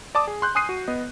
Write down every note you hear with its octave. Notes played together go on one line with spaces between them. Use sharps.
D5 A5 D6 D#6
G#4
C6 F#6 G6
G#5 C6 D#6 F#6 C7 D#7
F#4
B3 D#5